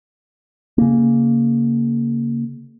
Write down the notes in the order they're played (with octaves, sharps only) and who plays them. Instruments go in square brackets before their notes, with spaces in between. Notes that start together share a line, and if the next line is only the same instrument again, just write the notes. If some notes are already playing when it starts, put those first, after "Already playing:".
[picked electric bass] C#3 A#3